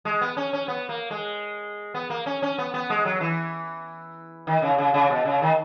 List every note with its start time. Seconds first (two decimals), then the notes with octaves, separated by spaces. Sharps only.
0.05 G#3
0.21 B3
0.37 C#4
0.53 C#4
0.68 B3
0.89 A#3
1.11 G#3
1.94 B3
2.10 A#3
2.26 C#4
2.42 C#4
2.58 B3
2.74 B3
2.90 G#3
3.05 F#3
3.21 E3
4.47 D#3
4.62 C#3
4.78 C#3
4.94 C#3
5.10 B2
5.25 C#3
5.42 D#3